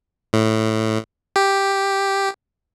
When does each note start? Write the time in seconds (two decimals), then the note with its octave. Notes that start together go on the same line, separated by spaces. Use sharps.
0.33 A2
1.36 G4